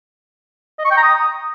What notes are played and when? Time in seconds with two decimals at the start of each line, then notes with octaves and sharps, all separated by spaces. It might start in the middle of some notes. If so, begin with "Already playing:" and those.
0.79 D#5
0.85 C#6
0.91 G5
0.97 A#5
1.03 D#6